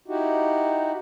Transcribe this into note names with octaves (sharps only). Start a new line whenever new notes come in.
D#4 E4 F#4 G4